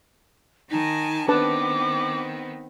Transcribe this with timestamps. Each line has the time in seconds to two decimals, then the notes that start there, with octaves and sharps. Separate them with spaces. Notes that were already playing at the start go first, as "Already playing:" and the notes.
0.70 D#3 D#4 G#5 A5
1.28 D#3 B3 C4 D4 B4 A5 D6